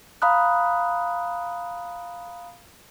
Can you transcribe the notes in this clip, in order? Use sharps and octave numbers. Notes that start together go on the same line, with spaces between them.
F5 A#5 B5 D#6 F#6